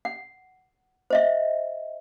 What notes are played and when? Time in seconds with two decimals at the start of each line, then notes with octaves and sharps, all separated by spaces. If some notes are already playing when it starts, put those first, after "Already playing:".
0.05 F#5
1.10 C5 D#5 E5